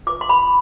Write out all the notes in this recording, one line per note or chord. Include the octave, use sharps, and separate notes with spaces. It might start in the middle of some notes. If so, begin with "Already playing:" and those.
F4 B4 D6
C6
B5